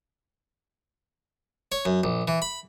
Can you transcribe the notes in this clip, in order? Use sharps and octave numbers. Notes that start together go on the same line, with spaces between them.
C#5
F#2
A#1
E3
B5